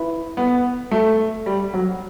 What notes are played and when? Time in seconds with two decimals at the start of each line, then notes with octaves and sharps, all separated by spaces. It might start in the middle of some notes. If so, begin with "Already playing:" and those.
Already playing: E4 B4
0.37 B3
0.91 A3
1.46 G3
1.74 F#3